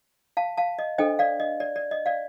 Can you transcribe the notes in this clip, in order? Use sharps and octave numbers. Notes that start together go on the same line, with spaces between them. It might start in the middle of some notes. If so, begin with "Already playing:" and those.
F5 A5
F5 A5
D#5
D4 A4 C5 D#5 G5
D5 F5
D#5
D5
D5
D#5
D5 F5